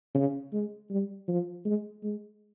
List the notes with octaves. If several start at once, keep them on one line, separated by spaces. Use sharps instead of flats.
C#3
G#3
G3
F3
G#3
G#3